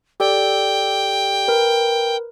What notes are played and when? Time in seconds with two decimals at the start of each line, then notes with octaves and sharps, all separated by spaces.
0.20 G4 A4 D5 G5
1.48 A#4 B4